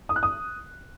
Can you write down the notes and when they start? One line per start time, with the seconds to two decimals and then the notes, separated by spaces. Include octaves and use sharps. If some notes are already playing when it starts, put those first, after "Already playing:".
0.09 D#6
0.16 F#6
0.23 D#6